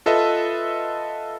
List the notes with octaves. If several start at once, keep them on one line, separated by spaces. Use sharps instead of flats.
F4 A4 B4 D#5 E5